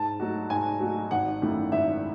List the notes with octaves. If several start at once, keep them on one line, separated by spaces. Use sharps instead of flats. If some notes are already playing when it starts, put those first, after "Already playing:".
Already playing: G#2 A5
F#3 A3 D#4 F#4
G#2 G#5
F#3 A3 D#4 F#4
G#1 F#5
F#2 D#3 A3 E4
G#1 E5